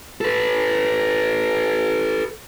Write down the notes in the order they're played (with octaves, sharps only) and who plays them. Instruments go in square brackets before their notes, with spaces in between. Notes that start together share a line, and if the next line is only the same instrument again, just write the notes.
[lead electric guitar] A4 B4